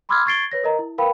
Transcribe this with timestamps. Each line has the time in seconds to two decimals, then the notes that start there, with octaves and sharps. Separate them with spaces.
0.09 B5 C6 D6 E6 F6 G#6
0.26 C#6 G#6 A6 C7 D7 G7
0.52 B4 C#5 A#6
0.64 A#4 D#5 A#5
0.79 E4
0.98 A#4 B4 F5 G5 B5